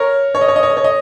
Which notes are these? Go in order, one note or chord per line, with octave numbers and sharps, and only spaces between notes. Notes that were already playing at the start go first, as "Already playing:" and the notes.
Already playing: A#4 C#5
C#5
D#5
C#5
D#5
C#5
D#5
C#5
D#5